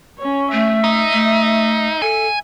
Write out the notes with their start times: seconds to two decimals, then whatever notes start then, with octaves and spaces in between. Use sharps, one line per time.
0.19 C#4 C#5
0.52 A3 E5
0.84 D#4
1.13 A3
2.02 A4 G#5